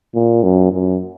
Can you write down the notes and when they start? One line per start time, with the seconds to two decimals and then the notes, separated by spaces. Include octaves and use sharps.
0.15 A#2
0.43 F#2
0.71 F#2